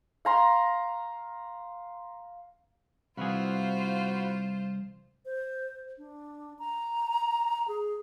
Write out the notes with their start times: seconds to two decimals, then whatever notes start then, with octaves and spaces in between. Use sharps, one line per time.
0.25 F5 A#5 C6
3.17 C2 E3 F4 F#4 G#4 C5 F5 B5
5.25 C5
5.98 D4
6.59 A#5
7.68 G#4